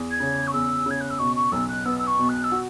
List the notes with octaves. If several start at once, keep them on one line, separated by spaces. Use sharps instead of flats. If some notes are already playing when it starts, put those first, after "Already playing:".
Already playing: E2
G#6
C#3
C#6
E2 E6
C#3 G#6
F#6
E6
B2 C#6
C#6
B1 E6
F#6
B3 E6
E6
C#6
B2
F#6
E6
F#4